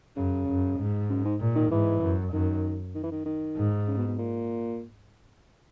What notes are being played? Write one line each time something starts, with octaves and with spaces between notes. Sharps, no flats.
F#2 C#3
F#2
G#2
F#2
G#2
A#2
D#3
G#2 E3
F#2
F#2 D#3
D#3
E3
D#3
D#3
G#2
C#3
B2
B2
A#2